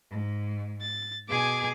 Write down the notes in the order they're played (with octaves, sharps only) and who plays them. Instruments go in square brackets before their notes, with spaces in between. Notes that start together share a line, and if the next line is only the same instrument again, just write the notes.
[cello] G#2
[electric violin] A6
[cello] B2 G#4 [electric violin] G#5 D6